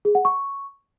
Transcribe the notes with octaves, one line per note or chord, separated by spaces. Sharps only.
G#4
F#5
C#6